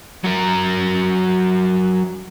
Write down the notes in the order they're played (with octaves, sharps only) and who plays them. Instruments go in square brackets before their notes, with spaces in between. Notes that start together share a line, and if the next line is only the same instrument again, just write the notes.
[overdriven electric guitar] F#3 A#4